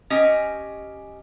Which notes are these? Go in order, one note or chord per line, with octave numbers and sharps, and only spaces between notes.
C#4 G4 D#5 G#5